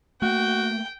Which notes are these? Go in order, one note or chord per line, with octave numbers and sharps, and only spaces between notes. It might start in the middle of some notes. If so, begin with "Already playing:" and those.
A3 A#3 F#4 G5